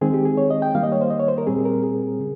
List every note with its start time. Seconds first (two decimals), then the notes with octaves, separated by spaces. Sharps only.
0.01 D#3 G#3 C4 G#4
0.14 G4
0.25 G#4
0.37 C#5
0.50 D#5
0.62 G5
0.75 D#3 G3 A#3 F5
0.83 D#5
0.92 C#5
1.01 C5
1.10 D#5
1.20 C#5
1.28 C5
1.38 A#4
1.47 A#2 G3 C4 G#4
1.65 A#4
1.84 G#4
2.20 C#3